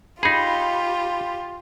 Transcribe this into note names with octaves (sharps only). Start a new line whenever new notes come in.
D#4 F4 G4 G#4 B5